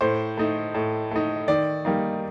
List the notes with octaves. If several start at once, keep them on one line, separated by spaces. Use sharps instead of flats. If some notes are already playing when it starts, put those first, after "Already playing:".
A2 C5
A3 D#4
A2
A3 D#4
D#3 D5
G3 A#3 D#4